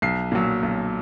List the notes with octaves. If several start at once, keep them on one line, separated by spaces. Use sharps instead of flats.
B1 C7
A#2 F#3
B1